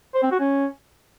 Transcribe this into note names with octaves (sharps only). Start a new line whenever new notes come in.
C5
C4
F#4
C#4